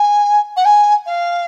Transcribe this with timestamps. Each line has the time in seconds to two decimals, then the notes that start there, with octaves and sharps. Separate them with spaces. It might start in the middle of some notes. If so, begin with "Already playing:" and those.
Already playing: G#5
0.56 F#5
0.65 G#5
1.06 F5